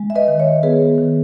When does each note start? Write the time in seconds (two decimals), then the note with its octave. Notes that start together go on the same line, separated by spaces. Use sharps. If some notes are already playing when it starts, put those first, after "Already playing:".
Already playing: G#3
0.10 E5
0.16 B4 D#5
0.28 D#3
0.39 C#5 E5
0.63 B3 G#4 B4
0.98 D#3